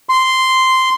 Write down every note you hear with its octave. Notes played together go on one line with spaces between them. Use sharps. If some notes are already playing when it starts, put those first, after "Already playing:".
C6